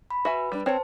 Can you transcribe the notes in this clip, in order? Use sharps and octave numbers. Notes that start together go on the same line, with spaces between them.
B5
F#4 B4 E5 G#5
G3 D4
C4 C5 C#5 A5